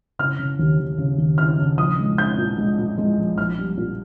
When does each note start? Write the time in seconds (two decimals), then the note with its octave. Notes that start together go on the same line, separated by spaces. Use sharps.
0.19 C#3 F6
0.39 C#3
0.59 D#2
0.79 D#2
0.98 C#3
1.18 D#2
1.38 C#3 F6
1.58 C#3
1.78 A#1 D#6
1.99 G#3
2.17 G#3 G6
2.38 A#2
2.57 G#3
2.78 A#2
2.98 G#3
3.17 A#1
3.38 A#1 F6
3.58 G3
3.77 A#2